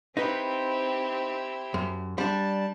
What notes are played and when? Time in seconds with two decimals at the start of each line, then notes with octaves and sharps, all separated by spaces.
0.17 C4 D#4 E4 G4 B4
1.74 F#2
2.18 G3 D4 A5